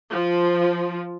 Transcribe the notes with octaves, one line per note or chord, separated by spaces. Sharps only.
F3